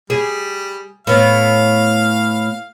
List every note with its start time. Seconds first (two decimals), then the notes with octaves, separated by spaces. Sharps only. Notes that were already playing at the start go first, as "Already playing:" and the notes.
0.10 G3 G#4
1.07 A2 B3 F5